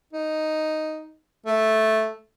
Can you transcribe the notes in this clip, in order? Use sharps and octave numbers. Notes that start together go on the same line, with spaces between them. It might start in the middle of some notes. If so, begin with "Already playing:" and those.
D#4
A3